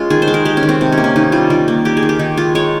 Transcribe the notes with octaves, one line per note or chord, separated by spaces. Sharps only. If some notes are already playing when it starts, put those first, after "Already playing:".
Already playing: G#3 C#4 F4
D#3 G#4
C5
G#3
A#4
G#3 G4
C#4
D#3
C4
C3
C#4
A#3
C#4
D#3 D#4
G3 F4
D#3 F4
A#3
A#3 G4
G#4
D#3
G4
D#3 D#4
G#3 F4
G#3 C#5